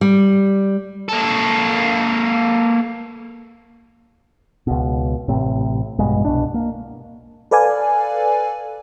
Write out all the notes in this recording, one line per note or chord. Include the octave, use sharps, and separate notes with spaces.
G3
A#3 A4
C#2 B2
A1 A2 C3
A#1 G2 B2 G#3
C2 B2 D4
A#3
A4 B4 D5 F5 G#5